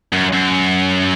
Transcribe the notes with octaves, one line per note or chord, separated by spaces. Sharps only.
F#2
F#2